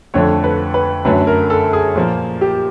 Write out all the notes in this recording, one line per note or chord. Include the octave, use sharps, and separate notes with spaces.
F2 D3 F3 A3 C#5
B4
B4
F#2 D3 F#3 A3 B4
A#4
A4
G#4
A#2 F3 A#3
G4